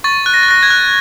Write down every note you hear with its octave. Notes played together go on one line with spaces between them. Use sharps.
C#6 A6
F#6
A#6
A6
F#6 A#6
G#6
F#6